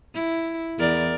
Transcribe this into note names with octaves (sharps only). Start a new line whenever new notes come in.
E4
E2 A#4 D5